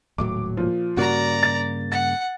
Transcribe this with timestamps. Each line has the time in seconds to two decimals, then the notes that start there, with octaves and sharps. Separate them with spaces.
0.18 D#1 A2 F#3 D6
0.57 A#2 F3
0.97 G2 C#3 A#3 F#4 D5 A#5
1.43 A6
1.92 F#5 A6